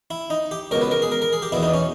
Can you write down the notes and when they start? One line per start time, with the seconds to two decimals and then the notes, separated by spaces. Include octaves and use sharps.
0.11 E4
0.30 D#4
0.51 G4
0.71 C#2 B2 A#4
0.81 B4
0.91 A#4
1.02 G#4
1.12 A#4
1.22 A#4
1.33 G#4
1.42 G4
1.52 E2 B2 E4
1.63 D#4
1.74 C#4